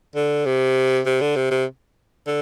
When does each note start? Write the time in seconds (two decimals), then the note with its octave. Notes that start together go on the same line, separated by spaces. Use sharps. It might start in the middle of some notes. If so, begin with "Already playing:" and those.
0.15 D3
0.45 C3
1.06 C3
1.21 D3
1.36 C3
1.51 C3
2.27 D3